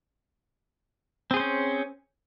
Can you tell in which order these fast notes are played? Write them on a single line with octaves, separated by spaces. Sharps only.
C4 G#4 C5 C#4